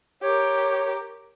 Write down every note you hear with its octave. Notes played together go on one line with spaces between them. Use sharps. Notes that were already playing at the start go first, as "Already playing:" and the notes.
G4 A#4 C#5